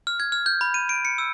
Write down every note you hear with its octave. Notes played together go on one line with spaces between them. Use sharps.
F6
G#6
F6
G6
B5
D#7
D7
C#7
E6